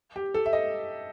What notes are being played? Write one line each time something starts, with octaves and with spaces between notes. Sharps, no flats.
G4
A4
E5
D#5